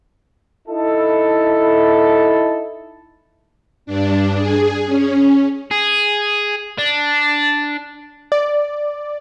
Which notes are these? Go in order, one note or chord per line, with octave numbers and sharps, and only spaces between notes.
D#4 E4 A4
G2 D4
G#4
C#4
G#4
D4
D5